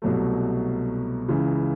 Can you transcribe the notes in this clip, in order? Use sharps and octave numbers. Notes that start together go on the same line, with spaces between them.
C2 B2 F#3 A3
C#2 C#3 E3